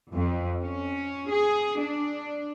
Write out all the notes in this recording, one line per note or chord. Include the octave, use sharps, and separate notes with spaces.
F2
C#4
G#4
D4